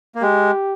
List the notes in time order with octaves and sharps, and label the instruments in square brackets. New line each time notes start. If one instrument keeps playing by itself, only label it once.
[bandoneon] A#3
[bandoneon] G#3 [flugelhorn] G4